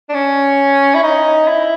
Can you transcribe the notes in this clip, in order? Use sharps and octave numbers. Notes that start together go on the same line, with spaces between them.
D4
C#4
E4
D#4
E4